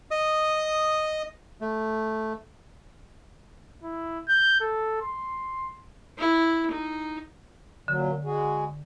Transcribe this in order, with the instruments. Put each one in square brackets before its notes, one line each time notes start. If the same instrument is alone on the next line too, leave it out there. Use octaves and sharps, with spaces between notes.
[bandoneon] D#5 D#6
A3
[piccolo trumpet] E4
G6
A4
C6
[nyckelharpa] E4
D#4
[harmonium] A#2 F#3 [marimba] D3
[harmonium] G#3 F#4 G#4